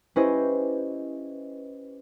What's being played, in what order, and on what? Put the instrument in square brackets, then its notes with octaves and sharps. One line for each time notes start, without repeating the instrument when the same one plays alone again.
[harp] C#4 E4 G4 B4 C5 D#5